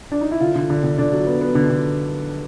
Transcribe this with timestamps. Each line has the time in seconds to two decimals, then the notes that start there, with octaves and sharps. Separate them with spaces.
0.12 D4
0.21 D#4
0.31 E4
0.40 D3 F4
0.55 D3
0.70 D3
0.84 D3
0.98 D3 D4
1.13 F#3
1.27 B3
1.41 B3
1.55 D3
1.70 D3